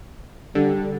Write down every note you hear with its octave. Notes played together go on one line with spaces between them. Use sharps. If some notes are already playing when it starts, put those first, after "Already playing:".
D3 G3